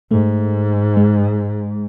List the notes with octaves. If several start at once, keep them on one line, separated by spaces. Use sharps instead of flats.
G#2 A3
G#3